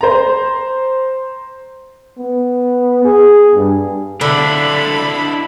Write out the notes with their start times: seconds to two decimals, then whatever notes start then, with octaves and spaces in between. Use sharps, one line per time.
0.01 C5 A#5
2.19 B3
3.04 G#4
3.55 G2
4.21 D3 D4 E4 B5